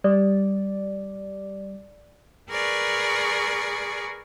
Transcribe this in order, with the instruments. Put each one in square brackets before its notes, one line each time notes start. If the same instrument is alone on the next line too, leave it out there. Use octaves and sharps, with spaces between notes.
[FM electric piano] G3 [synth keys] D5
[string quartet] G#4 A#4 B4 D5 C#6